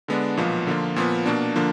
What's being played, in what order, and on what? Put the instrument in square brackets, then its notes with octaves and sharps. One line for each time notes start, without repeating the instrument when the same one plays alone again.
[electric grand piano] D3 G#3 B3 D4
B1 A#2 F3 B3
D3 F3 A#3 F4
A#2 F3 B3
B2 A#3 D4
D3 F3 A#3 D4